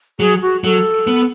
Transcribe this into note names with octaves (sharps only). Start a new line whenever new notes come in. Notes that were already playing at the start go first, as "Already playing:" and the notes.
F#3 G#4
F#4
F#3 A4
B3